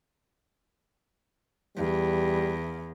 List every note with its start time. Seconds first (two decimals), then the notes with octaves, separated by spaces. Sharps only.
1.77 E2 G3